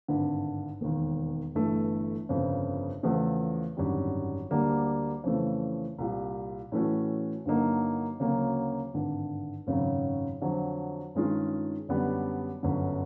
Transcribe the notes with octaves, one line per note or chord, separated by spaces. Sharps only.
G#1 G2 D3
E1 D#2 D#3
G1 G2 E3 A3
G1 F2 C#3
E2 C#3 F3 A3
G#1 F#2 D3 G3
D2 D3 G3 A#3 D4
F2 C#3 E3 A3
C2 A#2 G3
A2 E3 A3 C#4 F#4
G2 D3 F#3 A#3 D#4
D2 C#3 F#3 A#3 C#4
G#1 G2 D3
G#1 F#2 C#3 F#3
F2 D3 F#3
G2 D#3 G#3 C#4 F4
F#2 D3 G3 B3 D4
G1 F#2 D3